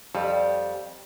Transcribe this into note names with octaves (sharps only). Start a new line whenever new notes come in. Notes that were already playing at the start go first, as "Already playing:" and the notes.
F2 G3